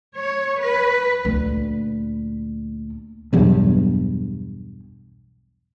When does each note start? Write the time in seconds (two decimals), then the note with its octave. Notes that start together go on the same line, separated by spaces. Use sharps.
0.17 C#5
0.61 B4
1.25 D2 A#2
3.33 B1 E2 G2